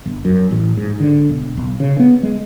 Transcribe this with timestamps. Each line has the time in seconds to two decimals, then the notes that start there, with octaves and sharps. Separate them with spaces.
0.06 G1
0.25 F#2
0.51 A1
0.77 G#2
1.00 D3
1.29 E1
1.57 B1
1.80 C#3
2.00 B3
2.23 G#3